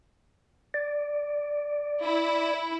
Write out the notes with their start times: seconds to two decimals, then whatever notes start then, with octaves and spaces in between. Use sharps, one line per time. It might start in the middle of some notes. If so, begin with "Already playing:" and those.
0.74 D5
2.03 E4